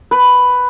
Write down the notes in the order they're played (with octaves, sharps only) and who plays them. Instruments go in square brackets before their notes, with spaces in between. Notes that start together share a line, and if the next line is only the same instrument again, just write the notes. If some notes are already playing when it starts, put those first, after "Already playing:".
[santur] B4